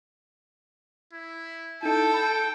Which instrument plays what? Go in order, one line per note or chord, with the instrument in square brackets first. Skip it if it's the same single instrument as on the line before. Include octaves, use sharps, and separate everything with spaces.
[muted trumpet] E4
[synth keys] D#4 E4 [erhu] A4 [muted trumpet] G5
[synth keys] B5